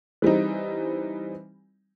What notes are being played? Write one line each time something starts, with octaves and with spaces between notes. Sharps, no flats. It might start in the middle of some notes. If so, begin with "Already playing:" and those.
E3 G3 C4 D#4